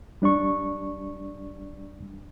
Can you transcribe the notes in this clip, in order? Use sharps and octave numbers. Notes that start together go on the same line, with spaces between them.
G3 D4 D5 C#6